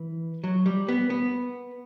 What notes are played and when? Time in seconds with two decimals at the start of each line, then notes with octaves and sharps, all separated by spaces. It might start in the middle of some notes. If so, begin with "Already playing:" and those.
Already playing: E3
0.44 F#3
0.66 G3
0.89 B3
1.10 B3